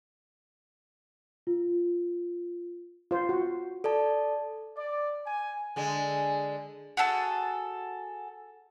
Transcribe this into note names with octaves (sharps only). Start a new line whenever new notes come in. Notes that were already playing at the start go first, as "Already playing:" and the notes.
F4
F4 C5
F#4
A4 D5 A5
D5
G#5
D3 G#3
F#4 G#4 A4 A5